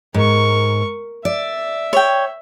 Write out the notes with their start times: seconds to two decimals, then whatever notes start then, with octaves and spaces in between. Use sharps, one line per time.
0.14 G#2 A#4 C#6
1.25 D5 E5
1.93 C#5 G5